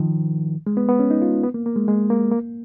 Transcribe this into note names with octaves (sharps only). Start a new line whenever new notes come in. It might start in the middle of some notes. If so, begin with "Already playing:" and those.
Already playing: D#3 F3
G#3
B3
B3
C#4
D#4
F4
B3
A#3
A#3
G#3
G#3
A#3
A#3